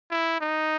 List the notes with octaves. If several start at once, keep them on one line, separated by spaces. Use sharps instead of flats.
E4
D#4